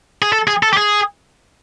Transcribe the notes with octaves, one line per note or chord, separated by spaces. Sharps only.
G#4
A4
G#4
A4
G4
G#4